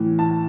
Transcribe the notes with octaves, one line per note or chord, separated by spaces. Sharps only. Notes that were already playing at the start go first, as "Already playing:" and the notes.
Already playing: A2 E3
A5